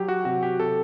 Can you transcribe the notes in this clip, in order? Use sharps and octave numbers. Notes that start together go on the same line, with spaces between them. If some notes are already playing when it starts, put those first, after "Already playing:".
Already playing: F#3 G4
F#4
C3 F#4
G4
C3 A4